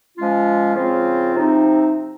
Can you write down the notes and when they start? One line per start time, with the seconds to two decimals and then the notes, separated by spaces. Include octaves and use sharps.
0.17 F3 G#3 C#4 F4
0.75 C#3 F3 C4 F4
1.35 C3 F3 C4 D#4